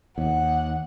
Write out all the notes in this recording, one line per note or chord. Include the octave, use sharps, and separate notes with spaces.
D#2 F#5